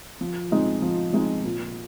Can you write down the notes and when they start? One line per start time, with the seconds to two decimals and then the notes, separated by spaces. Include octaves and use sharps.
0.21 F3
0.51 G#3 C4 D#4
0.82 F3
1.13 G#3 C4 D#4
1.45 A#2